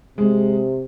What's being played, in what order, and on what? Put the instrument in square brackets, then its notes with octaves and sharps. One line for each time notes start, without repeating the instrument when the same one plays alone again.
[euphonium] C3 [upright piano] G#3